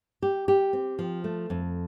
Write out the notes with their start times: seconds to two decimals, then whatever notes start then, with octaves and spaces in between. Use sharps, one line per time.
0.22 G4
0.48 G4
0.73 C4
0.99 F3
1.24 A3
1.50 F2